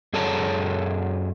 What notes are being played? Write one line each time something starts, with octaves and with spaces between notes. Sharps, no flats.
F#2 G#4 A4 C#5 A5 A#5